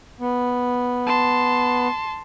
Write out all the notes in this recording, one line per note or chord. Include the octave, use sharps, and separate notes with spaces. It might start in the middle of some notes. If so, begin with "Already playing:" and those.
B3
A5 C6